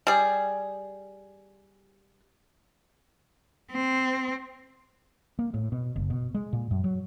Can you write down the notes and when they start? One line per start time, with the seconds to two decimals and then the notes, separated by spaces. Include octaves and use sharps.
0.07 G3 G#4
3.72 C4
5.39 A#3
5.54 A2
5.72 B2
5.96 F#1
6.10 B2
6.35 G#3
6.53 A#2
6.71 F#2
6.84 F#3